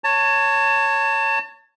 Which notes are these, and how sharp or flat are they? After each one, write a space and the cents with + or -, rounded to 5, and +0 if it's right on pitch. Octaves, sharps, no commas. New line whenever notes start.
C#5 +0 A5 +30